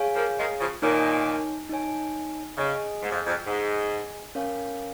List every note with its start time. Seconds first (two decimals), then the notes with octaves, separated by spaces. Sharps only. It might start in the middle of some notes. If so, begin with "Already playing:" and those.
Already playing: G#4 C#5 F5 G#5
0.16 F3 A#3
0.38 D#3 G#3
0.59 C#3 F3
0.82 A#2 D#3 D#4 C#5 G#5
1.70 D#4 C#5 G#5
2.58 C#3 G#4 D#5 G#5
3.02 G#2
3.10 F2
3.27 F2
3.46 G#2 G#4 D#5 G#5
4.35 C#4 A#4 C#5 F5 G#5